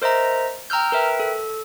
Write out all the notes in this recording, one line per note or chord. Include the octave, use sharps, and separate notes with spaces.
A#4 C5 D#5 E5 A#5
G5 A#5 E6 F6 G6
A#4 B4 E5 G5
A4